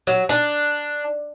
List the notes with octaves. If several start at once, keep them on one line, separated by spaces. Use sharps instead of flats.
F#3
D4